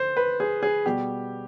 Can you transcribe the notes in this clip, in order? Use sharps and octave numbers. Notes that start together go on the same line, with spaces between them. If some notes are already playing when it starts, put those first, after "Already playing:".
Already playing: D3 C5
B4
G#4
G#4
B2 G3 G4